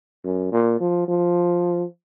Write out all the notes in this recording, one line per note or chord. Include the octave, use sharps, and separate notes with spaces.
F#2
A#2
F3
F3